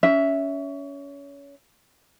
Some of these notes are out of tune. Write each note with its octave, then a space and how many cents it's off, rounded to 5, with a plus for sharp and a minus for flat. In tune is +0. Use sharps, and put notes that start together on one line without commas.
C#4 +25 E5 +0